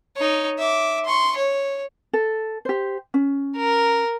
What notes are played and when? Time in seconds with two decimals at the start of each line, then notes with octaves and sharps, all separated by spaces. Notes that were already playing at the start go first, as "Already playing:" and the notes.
0.16 D#4 C#5
0.58 E5 D6
1.05 C6 C#6
1.36 C#5
2.13 A4
2.65 G4 C5
3.14 C#4
3.56 A#4